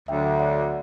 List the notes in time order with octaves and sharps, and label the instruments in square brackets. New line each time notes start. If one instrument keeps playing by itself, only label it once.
[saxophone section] D2 D3 F#3 [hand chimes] E5 G5
[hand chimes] D5 F#5